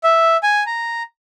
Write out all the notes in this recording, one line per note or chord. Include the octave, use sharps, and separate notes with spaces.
E5
G#5
A#5